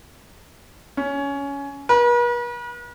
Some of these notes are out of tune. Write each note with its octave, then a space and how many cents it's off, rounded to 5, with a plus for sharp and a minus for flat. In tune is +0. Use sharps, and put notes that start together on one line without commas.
C#4 +15
B4 -45